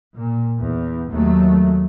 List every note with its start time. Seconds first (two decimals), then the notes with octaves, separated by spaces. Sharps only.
0.14 A#2
0.61 E2
1.11 D#2 F#3 A3